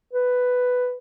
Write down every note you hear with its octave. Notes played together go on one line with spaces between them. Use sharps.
B4